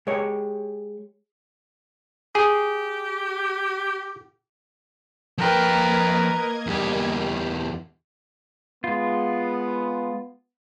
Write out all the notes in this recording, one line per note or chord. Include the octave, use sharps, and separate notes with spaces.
G#3 G4 C#5
G4 G#4
F3 A#3 A#4 B4 D#5 G5 G#6
E2 G3 G4
G#3 B3 F4